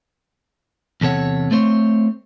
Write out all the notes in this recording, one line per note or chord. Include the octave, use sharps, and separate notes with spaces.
E2 C3 A4 C#5 F#5
A3 C4 C5 C#5